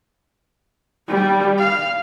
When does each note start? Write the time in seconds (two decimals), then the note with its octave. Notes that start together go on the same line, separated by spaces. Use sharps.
1.08 G3
1.58 F5